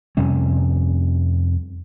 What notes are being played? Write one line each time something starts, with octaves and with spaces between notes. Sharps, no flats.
F2 C3 G3 C#4